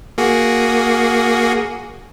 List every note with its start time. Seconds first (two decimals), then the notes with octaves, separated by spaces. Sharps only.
0.18 A#3 F#4 G#4